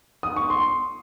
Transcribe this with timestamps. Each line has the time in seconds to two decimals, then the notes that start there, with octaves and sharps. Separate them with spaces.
0.23 D#6
0.36 C#6
0.50 C6